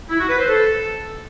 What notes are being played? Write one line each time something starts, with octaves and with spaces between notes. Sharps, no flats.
E4
F#4
B4
C5
A4